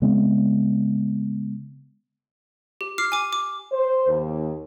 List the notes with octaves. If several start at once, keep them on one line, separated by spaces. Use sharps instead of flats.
C#3 G#3 B3 C4
G4
D6 F6 C7
G#5 D6
D6
C5
D#2